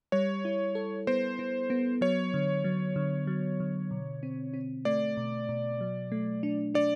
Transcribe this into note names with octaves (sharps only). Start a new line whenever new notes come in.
G3 C#5
E4
A4
B3 C5
B3
B3
F#3 C#5
D3
F#3
D3
F#3
D3
B2
C4
C4
A3 D5
B2
B2
F#3
A3
D4
D4 D5